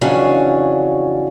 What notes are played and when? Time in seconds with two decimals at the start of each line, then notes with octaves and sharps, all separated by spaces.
0.01 F2 C#3 E3 F#3 C#4 D4